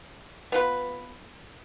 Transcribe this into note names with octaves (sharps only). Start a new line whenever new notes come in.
B3 F4 B4